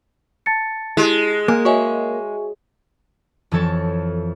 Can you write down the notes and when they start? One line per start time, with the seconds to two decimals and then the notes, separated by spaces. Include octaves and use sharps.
0.46 A5 A6 C#7
0.97 G#3 E4 G4
1.48 A#3 G#5
1.65 F#4 C#5 D#5 E5 G#5 C#6
3.51 F2 E3 F3 A4 C#5 A6